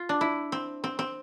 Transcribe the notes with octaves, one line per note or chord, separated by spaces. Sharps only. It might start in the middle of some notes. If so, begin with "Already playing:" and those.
Already playing: F4
D4
E4
C4
C4
C4